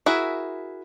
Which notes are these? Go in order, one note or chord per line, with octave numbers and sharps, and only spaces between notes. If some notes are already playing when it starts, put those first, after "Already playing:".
E4 F#4 G#4 A#4 E5